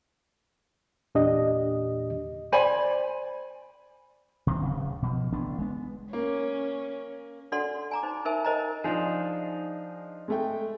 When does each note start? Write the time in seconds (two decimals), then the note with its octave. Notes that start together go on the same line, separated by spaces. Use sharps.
1.15 E2 A#2 D4 G4 D#5
2.52 C5 D5 G#5 B5
4.47 C3 D#3 G#3 C4
4.62 D1 C#3
5.02 B2 F3
5.32 A1 D3 B3 D4
5.58 G#3 B3
6.13 A#3 C#4
7.52 D4 F#4 A4 D5 F#5 C6
7.91 G#5 A#5 D6
8.03 D#4 C5
8.25 D#4 A#4 C5 E5 G#5
8.45 A#4 C5 D#5 G5 A#5
8.84 F3 D4 D#4 G#4
10.28 G#3 A3 G5